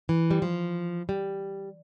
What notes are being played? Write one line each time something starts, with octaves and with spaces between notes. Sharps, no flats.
E3
G3
F3
G3